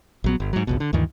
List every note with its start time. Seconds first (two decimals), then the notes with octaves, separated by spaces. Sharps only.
0.24 A#1 F#3 B3
0.40 G1
0.53 G#2 F#3
0.67 G#1 C#2 B2
0.80 D3
0.93 D2 G2 D#3 E3